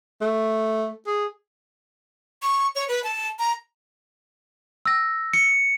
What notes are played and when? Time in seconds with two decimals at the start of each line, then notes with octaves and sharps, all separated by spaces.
0.21 A3
1.07 G#4
2.42 C#6
2.75 C#5
2.88 B4
3.04 A5
3.39 A#5
4.86 E6 A#6
5.33 C#7